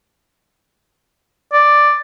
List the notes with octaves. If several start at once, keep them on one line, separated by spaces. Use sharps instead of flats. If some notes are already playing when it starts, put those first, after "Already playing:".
D5